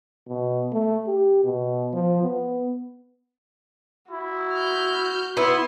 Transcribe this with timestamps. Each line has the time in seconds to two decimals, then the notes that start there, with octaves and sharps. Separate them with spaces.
0.28 B2
0.72 A3
1.07 G4
1.44 B2
1.93 F3
2.23 B3
4.11 E4 F#4
4.54 F6 G6
5.37 B3 E4 E5 C6